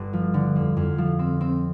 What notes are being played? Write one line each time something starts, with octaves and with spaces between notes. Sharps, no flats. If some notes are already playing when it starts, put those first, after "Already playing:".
Already playing: G1
F3
D3
F2
F2
F3
C4
C4